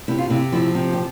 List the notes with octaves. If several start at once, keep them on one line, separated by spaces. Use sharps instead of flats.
C3 E4
F4
C3 E4
F3 E4
C3
G4